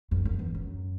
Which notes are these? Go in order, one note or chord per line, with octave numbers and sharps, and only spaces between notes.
F#2
F#2
E2
F#2